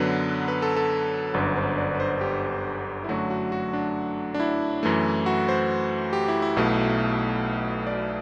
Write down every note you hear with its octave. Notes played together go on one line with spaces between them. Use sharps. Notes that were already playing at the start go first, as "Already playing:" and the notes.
Already playing: F#2 D3 F#3 B3 B4
B4
A4
A4
G1 F#2 D3 B4
C5
D5
B4
C5
G4
E4
F#2 D3 F#3 A3 F#4
F#4
F#4
D4
D4
E4
F#2 E3 A3
F#4
C5
G4
E4
E4
B1 B2 A3
D5